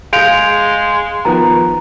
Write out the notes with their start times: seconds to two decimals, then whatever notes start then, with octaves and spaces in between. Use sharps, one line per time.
0.13 G#3 G#4 F5 G6 D7 F7
1.25 D#3 F3 B3 A#5